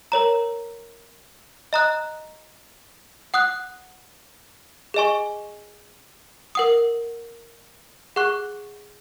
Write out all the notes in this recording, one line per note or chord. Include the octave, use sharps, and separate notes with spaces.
A#4 C#5 A#5
D#5 A#5 D#6 F#6
F#5 D#6 F#6
G#4 D#5 G#5 C#6
A#4 F#5 D#6
G#4 F#5 C#6 F#6